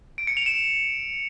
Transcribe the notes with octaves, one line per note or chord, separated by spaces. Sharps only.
D7
C#7
F7
E7